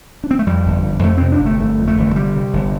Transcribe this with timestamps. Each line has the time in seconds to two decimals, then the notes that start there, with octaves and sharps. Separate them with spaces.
0.24 D4
0.31 C4
0.39 A3
0.46 F2 G3
0.66 G1
0.85 F2
1.03 F2 A3
1.17 C3 C4
1.32 D4
1.40 G1
1.46 A3
1.59 G1 A3
1.79 F2
1.88 A3
1.98 G1
2.16 C3 G3
2.35 C3
2.53 G1